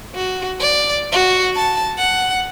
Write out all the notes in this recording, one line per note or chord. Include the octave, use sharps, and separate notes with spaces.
F#4
D5
F#4
A5
F#5